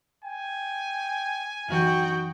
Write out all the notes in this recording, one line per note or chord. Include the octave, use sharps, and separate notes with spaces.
G5 G#5
F#2 E3 D#4 F#4 G5